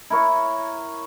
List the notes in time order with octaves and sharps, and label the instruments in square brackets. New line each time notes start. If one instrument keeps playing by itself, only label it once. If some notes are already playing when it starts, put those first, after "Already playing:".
[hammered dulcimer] E4 A#4 C#5